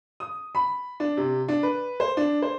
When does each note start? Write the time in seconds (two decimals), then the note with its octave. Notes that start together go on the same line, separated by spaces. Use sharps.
0.20 D#6
0.55 B5
1.00 D4
1.17 C3
1.48 D4
1.63 B4
2.00 C5
2.17 D4
2.42 C5